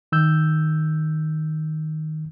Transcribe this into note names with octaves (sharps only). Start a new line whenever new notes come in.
D#3 E6 G6